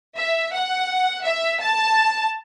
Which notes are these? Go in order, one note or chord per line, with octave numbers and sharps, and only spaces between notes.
E5
F#5
E5
A5